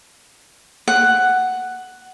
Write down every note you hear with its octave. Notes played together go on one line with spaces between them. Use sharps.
F#5